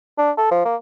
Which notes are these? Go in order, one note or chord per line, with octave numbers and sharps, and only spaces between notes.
D4
A4
F3
A#3